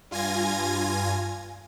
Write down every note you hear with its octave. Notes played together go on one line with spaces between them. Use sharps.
G2 F4 G#5 G#6 A#6